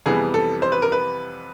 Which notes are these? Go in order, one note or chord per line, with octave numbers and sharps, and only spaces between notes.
F2 C3 E3 G3 B3 G#4
A4
C5
B4
A#4
B4